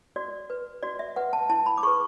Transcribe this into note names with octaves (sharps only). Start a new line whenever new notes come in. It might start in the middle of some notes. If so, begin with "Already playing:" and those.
F#4 D5
B4
F#4 D5
E5
B4 F#5
A5
E4 A5
B5
D6
G#4 B4 C#6